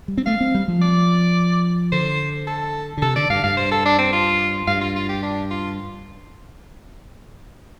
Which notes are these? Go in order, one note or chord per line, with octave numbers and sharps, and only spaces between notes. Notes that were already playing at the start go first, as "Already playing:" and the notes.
G3
C4
A3 F5
C4
G3
F3
D5
D3 C5
A4
D3
C3 A4
D3 D5
G2 F5
G2 F5
C5
A4
D4
C4
F4
G2 F5
F4
F4
G4
D4
F4